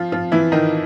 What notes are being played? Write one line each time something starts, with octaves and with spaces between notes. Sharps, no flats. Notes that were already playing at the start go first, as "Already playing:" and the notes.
Already playing: F3 F4
F3 F4
E3 E4
D#3 D#4